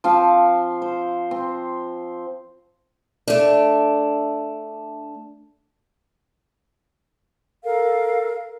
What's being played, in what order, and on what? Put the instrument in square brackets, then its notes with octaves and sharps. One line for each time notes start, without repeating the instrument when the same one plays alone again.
[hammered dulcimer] F3 C4 F5
C5
C4
[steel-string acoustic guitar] A3 D4
[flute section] A4 A#4 F5